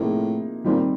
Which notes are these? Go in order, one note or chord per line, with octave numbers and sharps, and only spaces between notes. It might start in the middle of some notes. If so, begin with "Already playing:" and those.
Already playing: A2 C3 F3 A#3 D#4 G#4
A#2 D#3 G3 C4 D#4